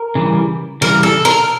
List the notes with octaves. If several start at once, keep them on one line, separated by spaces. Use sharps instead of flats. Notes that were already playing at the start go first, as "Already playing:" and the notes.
Already playing: A#4
C#3 E3 G3
C#3 E3 G3 A#4
A4
A#4